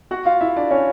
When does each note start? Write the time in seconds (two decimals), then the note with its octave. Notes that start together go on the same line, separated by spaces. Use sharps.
0.11 F#4 F#5
0.25 F4 F5
0.41 E4 E5
0.56 D4 D5
0.71 C#4 C#5